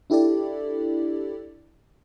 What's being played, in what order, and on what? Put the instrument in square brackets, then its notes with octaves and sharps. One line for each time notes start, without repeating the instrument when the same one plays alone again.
[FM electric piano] D4 E4 G4 A4 D5